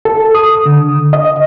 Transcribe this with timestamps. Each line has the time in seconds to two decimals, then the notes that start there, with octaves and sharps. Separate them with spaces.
0.05 A4
0.35 D#6
0.66 D3
1.13 D#5